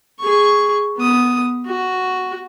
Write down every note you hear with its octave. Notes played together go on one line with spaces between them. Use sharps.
G#4 C#6
B3 D#6
F#4